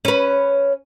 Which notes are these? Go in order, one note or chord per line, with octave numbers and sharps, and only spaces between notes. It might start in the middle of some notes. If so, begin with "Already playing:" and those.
C#4 B4